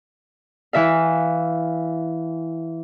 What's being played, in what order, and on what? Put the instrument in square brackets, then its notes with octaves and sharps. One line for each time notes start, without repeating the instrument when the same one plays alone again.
[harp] E3 E5 F5